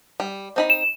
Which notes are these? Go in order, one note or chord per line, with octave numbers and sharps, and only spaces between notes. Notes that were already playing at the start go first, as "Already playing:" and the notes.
G3
C4 D#4 B5
E7